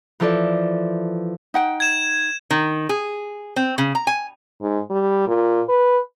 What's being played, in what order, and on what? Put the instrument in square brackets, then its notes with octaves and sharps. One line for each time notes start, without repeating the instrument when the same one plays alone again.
[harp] E3 F3 E4 A4 D5
[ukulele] D#4 F#5 G5
[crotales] G#6 E7
[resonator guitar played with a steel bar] D#3
G#4
C4
C#3
A#5
G#5
[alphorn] G#2
G3
A#2
B4